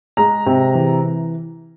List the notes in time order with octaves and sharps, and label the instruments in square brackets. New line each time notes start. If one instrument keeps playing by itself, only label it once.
[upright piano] G#3 A#5
C3
E3